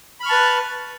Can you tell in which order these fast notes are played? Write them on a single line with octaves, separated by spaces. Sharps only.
B5 F6 C#6 A5 B4